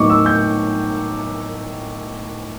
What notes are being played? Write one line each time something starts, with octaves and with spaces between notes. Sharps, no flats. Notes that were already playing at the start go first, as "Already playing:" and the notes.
Already playing: A2 F#3 B3 D#4 C#6 D6
E6
G6